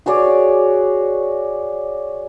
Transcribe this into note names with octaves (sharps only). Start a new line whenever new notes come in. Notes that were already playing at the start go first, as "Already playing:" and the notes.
F#4 G#4 C#5 D5